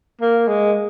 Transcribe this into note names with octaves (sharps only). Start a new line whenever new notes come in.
A#3
G#3